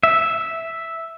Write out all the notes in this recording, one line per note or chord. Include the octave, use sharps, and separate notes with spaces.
E5